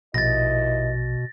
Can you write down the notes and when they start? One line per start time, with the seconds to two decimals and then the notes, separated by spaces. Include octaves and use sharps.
0.14 A#1 D#2 B2 E4 D#5 A6 A#6